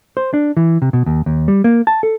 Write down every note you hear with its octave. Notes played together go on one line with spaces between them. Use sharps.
C5
D4
E3
C3
B2
D#2
D#2
G3
A#3
A5
A4